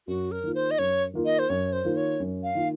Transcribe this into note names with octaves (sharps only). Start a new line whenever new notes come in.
F#2 F#4
A#4
D#3 A#3 F4
C5
D#5
F#2 C#5
D#3 A#3 F4
D#5
C5
F#2 C#5
C5
D#3 A#3 F4
C#5
F#2
F5
D#3 A#3 F4